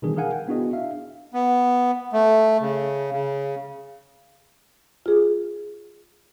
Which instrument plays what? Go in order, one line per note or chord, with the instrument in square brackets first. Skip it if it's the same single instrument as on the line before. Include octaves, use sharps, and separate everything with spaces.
[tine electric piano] B2 D#3 E3 G3 D4 G#4
G#4 A#4 F5 F#5 G#5
G5
B3 D4 E4 F#4 G#4 D#5
D4 E5 F5
[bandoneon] B3
A3
C#3
C#3
[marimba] F4 G#4